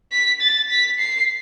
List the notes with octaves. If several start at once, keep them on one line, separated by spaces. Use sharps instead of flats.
B6
A6
B6
C7